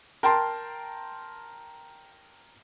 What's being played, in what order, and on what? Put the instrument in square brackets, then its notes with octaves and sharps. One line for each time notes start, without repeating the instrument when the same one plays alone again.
[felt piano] A#4 G5 A5 C6